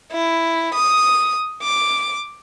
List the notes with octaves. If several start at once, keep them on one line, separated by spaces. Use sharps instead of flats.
E4
D#6
D6